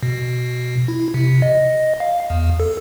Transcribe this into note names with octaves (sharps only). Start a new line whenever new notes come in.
B2
E4
C3
D#5
F5
E2
A4